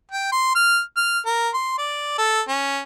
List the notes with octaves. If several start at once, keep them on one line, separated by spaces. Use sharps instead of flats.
G5
C6
F6
F6
A#4
C6
D5
A4
C#4